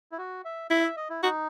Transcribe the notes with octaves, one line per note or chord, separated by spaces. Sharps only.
E4
F#4
E5
E4 E5
E5
D#5
E4
D#4 F#4